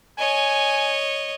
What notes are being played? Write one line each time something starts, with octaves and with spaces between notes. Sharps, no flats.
C#5 D#5 G#5